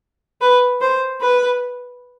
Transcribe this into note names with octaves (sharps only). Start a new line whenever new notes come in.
B4
C5
B4